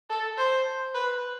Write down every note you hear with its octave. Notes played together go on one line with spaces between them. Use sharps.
A4
C5
B4